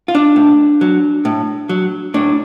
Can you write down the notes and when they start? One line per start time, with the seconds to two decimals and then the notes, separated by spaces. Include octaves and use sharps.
0.08 F4
0.15 D4
0.36 A2
0.81 F#3
1.25 A2
1.69 F#3
2.14 A2 D4